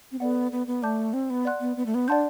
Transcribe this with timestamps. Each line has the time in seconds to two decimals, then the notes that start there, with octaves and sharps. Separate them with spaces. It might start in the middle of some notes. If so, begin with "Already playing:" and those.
0.12 C4
0.20 B3 A4 D5 F#5
0.52 B3
0.67 B3
0.83 A3 D5 A5 D6 G6
1.13 C4
1.30 B3
1.45 D5 F#5 C6 F#6
1.60 B3
1.77 B3
1.86 A3
1.95 B3
2.08 D4 D5 F#5 A5 C6 G6